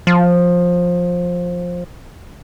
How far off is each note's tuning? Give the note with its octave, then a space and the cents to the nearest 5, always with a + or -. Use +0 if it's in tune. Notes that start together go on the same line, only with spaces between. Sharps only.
F3 +15